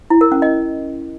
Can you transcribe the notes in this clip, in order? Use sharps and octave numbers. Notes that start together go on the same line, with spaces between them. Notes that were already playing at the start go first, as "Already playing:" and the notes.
E4
A#4
C#4
D#5